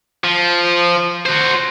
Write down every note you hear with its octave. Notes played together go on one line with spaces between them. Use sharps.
F3
F#4 C5